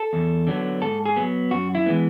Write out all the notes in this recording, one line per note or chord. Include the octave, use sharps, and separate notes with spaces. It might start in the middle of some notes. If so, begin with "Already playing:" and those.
Already playing: A4
E2
D3 F#3 B3
G#2 A4
G#4
F#3 B3
F#2 F#4
E4
E3 G#3 B3